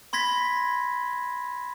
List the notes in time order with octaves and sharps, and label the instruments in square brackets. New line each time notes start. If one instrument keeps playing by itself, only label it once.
[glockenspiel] B5 C6 G#6 A#6 B6